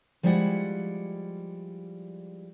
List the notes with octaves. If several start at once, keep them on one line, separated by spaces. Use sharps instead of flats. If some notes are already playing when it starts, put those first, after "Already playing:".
F3 G3 G#3 E4 D5 F#5